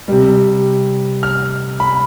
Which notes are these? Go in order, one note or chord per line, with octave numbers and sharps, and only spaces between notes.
C3 G3
F6
B5